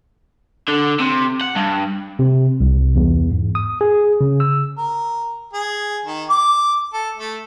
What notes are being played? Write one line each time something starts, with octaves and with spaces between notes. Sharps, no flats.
D3
C3
F#5
G2
C3
C2
E2
G#2
D#6
G#4
C#3
E6
A#4
G#4
D#3
D6
A4
A3